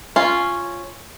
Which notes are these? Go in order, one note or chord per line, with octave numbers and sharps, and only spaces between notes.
C#4 F4